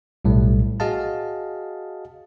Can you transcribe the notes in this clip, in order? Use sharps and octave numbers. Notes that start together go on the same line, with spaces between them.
B1 A2 G3 A3
F#4 G#4 D#5 F5 A5